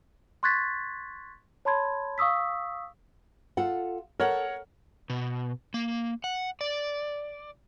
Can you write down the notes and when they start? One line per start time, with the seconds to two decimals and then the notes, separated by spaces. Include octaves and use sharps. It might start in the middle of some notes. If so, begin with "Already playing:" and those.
0.43 C6 C#6 F#6 G#6 A6 B6
1.65 C#5 A5 B5 C6 G#6
2.18 F5 C#6 D#6 E6 B6
3.57 F4 A4 F#5
4.20 A4 A#4 C#5 F#5
5.10 B2
5.74 A#3
6.24 F#5
6.61 D5